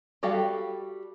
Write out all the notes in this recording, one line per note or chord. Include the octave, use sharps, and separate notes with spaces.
G3 F#4 G4 A4 F5